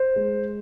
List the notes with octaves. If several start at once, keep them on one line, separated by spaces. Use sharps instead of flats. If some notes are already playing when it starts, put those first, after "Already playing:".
Already playing: C5
G#3